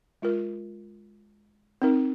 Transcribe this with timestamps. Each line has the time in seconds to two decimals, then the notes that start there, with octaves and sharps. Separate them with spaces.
0.22 G#3 F4 A#4
1.82 C4 D#4 A#4